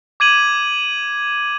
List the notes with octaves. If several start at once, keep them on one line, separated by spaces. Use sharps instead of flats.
D6 G#6 D#7 F#7